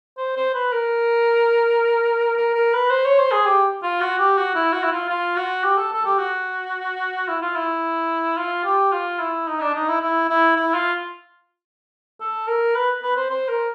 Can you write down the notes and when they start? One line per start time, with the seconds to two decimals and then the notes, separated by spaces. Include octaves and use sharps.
0.17 C5
0.37 C5
0.54 B4
0.72 A#4
2.37 A#4
2.55 A#4
2.73 B4
2.90 C5
3.05 C#5
3.19 C5
3.32 G#4
3.46 G4
3.83 F4
4.01 F#4
4.18 G4
4.37 F#4
4.55 E4
4.73 F#4
4.83 E4
4.92 F4
5.09 F4
5.36 F#4
5.64 G4
5.78 A4
5.92 A4
6.05 G4
6.19 F#4
7.28 E4
7.42 F4
7.56 E4
8.37 F4
8.64 G4
8.92 F4
9.20 E4
9.47 D#4
9.61 D4
9.75 D#4
9.89 E4
10.01 E4
10.29 E4
10.56 E4
10.74 F4
12.20 A4
12.47 A#4
12.75 B4
13.03 B4
13.16 C5
13.30 C5
13.48 A#4